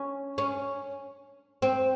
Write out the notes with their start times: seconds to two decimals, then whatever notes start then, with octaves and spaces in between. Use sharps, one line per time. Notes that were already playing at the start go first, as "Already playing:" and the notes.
Already playing: C#4
0.38 C#4
1.62 C4